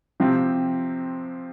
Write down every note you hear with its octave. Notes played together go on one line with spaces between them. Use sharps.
C3 F3 C4 G4